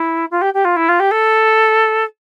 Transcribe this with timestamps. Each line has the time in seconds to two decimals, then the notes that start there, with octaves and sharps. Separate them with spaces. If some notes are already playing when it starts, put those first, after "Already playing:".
Already playing: E4
0.31 F4
0.41 G4
0.54 G4
0.65 F4
0.76 E4
0.89 F4
1.00 G4
1.11 A4